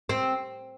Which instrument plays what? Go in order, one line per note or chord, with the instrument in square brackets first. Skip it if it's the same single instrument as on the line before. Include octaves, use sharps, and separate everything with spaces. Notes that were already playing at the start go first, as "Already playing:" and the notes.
[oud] C4